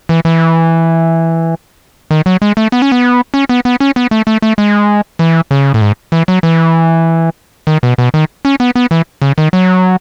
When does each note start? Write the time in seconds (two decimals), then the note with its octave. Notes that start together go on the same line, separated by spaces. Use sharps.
0.09 E3
0.25 E3
2.11 D#3
2.26 F#3
2.42 G#3
2.57 A3
2.72 B3
2.82 C#4
2.92 B3
3.34 C#4
3.49 B3
3.65 B3
3.80 C#4
3.96 B3
4.11 A3
4.27 A3
4.42 A3
4.58 G#3
5.19 E3
5.51 C#3
5.74 A2
5.81 G#2
6.12 E3
6.28 F#3
6.43 E3
7.67 D#3
7.83 B2
7.98 B2
8.14 D#3
8.45 C#4
8.60 B3
8.75 B3
8.91 E3
9.22 C#3
9.38 D#3
9.53 F#3